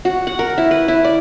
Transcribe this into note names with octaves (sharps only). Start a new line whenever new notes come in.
F#4
F#5
A#4
E4
B4
E4
D5